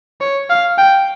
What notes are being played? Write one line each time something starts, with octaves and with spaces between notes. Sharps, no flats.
C#5
F5
G5